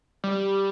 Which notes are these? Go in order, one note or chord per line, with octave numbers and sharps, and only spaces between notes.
G3